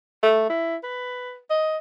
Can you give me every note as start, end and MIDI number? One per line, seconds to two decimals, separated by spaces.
0.23 0.45 57
0.50 0.76 64
0.83 1.38 71
1.50 1.77 75